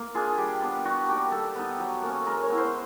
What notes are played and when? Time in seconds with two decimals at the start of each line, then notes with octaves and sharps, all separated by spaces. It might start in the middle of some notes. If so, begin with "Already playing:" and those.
Already playing: A#3
0.14 D4 F4 G#4
0.38 G3 G4
0.62 B3 D4
0.85 G3 F#4
1.09 A#3 D#4 G4
1.31 G3 A4
1.55 B3 D#4
1.80 F#3
2.02 A#3 C#4
2.26 G#3 A#4
2.42 C#5
2.49 B3 E4
2.58 C5